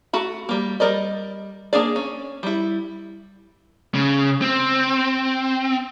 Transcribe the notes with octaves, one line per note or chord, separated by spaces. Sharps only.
A3 F#4 B5
G3 A#3
G3 A#4 D5 D#5
A#3 D4 G#4 D5
C#4
G3 E4
C#3
C4